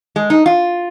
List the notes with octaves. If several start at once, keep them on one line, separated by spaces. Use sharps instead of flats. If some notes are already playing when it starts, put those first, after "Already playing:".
G#3
D#4
F4